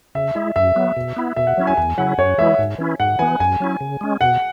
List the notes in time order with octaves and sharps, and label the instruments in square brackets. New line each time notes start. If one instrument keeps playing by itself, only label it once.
[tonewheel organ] C#3 [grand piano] E5
[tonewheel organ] G#3 E4
[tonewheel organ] F#2 [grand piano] E5
[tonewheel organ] F#3 B3
B2
B3 E4
[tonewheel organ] B2 [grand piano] E5
[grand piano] F#5
[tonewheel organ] F#3 C#4 E4
[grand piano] G#5
[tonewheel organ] E2 [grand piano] G#5
[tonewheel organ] C#3 F#3 E4 [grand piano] F#5
[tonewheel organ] F#2 [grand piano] C#5
[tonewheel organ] E3 G#3 E4 [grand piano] E5
[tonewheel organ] G#2
E3 C#4 E4
[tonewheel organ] G#2 [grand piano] F#5
[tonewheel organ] E3 B3 [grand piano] G#5
[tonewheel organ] F#2 [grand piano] G#5
[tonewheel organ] F#3 C#4 E4
C#3
G#3 C#4
[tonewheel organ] B2 [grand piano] F#5